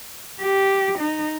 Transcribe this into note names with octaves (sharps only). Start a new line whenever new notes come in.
G4
D#4